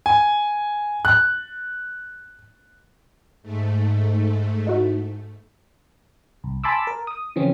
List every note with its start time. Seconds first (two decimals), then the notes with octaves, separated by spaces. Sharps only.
0.06 G#5
1.05 F#6
3.43 G#2 A3
4.67 D#4 E4 F#4
6.44 C2
6.64 G#5 A5 B5 C6 D6 E6
6.87 A#4
7.07 D#6
7.36 C#3 E3 F3 C4 C#4